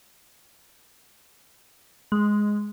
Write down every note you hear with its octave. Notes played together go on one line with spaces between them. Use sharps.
G#3